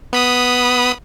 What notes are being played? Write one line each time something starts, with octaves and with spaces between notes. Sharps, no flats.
B3 B5 D#6